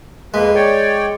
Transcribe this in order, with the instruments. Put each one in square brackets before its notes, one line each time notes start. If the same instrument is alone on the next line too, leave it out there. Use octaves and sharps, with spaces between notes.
[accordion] F2 A#3 B4 [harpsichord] G#3
[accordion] C#5 D5 G5